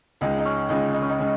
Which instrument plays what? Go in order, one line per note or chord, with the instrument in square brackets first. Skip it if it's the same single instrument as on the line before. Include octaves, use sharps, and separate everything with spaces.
[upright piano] C#2 C#3 G#3 [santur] D#4
[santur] D#4
C#4
[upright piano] C#2 C#3 G#3 [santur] D#4
[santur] D#4
C#4
D#4
[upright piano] C#3 G#3